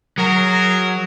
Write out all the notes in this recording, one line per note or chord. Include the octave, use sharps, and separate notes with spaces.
F#3 F#4 G#4 A#4